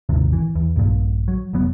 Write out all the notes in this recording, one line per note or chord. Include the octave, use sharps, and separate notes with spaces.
D#1 G#1 D#2 C3
E3
E2
A#1 G2 A#2
F#3
F1 F2 F#3 B3